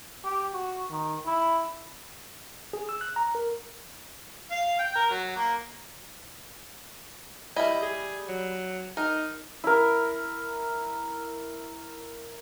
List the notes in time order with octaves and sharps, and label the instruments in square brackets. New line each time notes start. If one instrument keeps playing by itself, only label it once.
[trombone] G4
F#4
D#3
E4
[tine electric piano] G#4
E6
F#6
A#5
A#4
[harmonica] F5
G5
A#4
F#3
A#3
[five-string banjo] G3 E4 [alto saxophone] D#5
[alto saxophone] G#4
F#3
[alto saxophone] D#4 [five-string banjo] A#4
[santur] E4 A#4